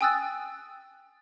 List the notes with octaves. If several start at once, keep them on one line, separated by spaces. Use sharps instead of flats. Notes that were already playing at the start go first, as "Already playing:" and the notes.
G5 G#5 D#6 E6 F#6 A6